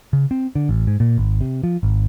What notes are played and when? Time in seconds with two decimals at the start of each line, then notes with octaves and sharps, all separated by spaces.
0.13 C#3
0.31 C4
0.55 D3
0.69 A1
0.87 G#2
1.00 A#2
1.18 G#1
1.41 C3
1.64 F3
1.83 G#1